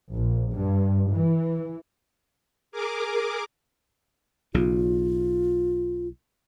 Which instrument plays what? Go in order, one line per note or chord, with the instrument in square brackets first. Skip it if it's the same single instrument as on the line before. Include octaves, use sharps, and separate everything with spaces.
[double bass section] A#1
G2
E3
[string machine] G#4 A#4 D6
[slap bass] B1 C#3 [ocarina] F4